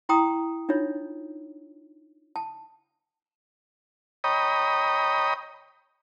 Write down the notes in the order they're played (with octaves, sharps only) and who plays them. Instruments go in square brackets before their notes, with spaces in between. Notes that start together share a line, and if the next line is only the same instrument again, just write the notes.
[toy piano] E4 G5 A#5 C6 D#6
D4 D#4 F4 C#5
A5
[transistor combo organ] C#5 D#5 G5 A#5 B5 D#6